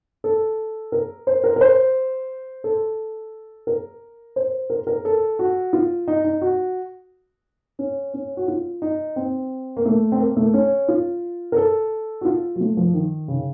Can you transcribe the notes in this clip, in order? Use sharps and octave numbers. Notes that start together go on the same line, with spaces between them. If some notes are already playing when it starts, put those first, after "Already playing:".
A4
A#4
C5
A#4
A#4
C5
A4
A#4
C5
A#4
A#4
A4
F#4
F4
D#4
D#4
F#4
C#4
C#4
F#4
F4
D#4
C4
A#3
A3
C4
A#3
A3
C#4
F4
A#4
A4
F#4
F4
F#3
A3
F3
D#3
C#3